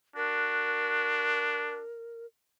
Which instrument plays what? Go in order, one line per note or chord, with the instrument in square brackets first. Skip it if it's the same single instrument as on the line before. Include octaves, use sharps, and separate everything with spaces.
[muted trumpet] D4 [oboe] F#4 [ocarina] A#4